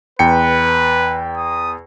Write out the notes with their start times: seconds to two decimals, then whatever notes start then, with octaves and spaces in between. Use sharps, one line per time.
0.19 E2 B4 G5 C#7
1.37 D#6